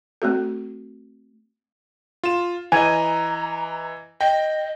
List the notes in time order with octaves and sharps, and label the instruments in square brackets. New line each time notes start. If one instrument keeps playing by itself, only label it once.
[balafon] A3 C4 F#4 A4
[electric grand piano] F4 E7
[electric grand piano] E3 D#5 [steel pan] G#5 [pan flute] A#5
[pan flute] D#5 [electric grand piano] G5